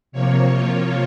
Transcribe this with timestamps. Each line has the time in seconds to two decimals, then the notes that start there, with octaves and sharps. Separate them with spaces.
0.12 C3 F3 A#3 C#5
0.52 F4